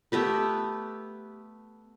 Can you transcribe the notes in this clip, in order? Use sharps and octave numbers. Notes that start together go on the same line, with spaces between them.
A3 B3 G4 B4